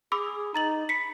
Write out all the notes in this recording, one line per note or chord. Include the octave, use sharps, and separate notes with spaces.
G#4 B5 D6 E6
D#4 A#5 A6 F#7
B5 B6 C#7